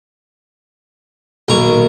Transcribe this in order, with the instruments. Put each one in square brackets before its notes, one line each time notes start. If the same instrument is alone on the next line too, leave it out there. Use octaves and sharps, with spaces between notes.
[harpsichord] B1 A#5 C#6 [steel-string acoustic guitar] A#2 D#3 A#3